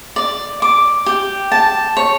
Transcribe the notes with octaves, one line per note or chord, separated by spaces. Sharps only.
D5
D6
G4
A5
C#5